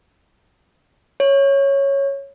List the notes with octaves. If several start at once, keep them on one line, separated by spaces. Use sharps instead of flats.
C#5